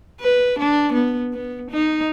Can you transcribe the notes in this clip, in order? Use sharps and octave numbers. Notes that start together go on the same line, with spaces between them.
B4
D4
B3
B3
D#4